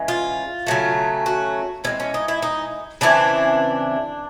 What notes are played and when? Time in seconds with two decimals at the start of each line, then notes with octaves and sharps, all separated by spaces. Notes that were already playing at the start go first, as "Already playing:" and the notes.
Already playing: C#3 E3 G#3
0.08 F4
0.67 C#3 F#3 A3
1.26 F#4
1.84 E3 G#3 C4 C#4
2.00 C#4
2.14 D#4
2.28 E4
2.42 D#4
3.01 C#3 E3 A3 C4 D4